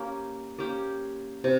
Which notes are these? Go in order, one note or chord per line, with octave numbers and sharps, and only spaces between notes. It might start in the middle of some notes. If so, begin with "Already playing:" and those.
Already playing: A#3 C#4 G4
A#3 C#4 G4
C3